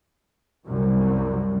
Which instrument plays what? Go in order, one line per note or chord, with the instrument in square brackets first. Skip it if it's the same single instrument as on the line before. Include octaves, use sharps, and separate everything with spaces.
[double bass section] C2 F#2